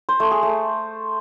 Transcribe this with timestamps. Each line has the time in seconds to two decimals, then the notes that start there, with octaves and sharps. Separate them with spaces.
0.09 C5
0.20 A3
0.31 G#4
0.43 A3